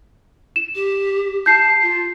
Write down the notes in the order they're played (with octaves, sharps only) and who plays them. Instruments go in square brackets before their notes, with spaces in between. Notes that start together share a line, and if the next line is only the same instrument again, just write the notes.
[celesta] E7
[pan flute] G4
[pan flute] A5 [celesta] G6 C7
[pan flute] F4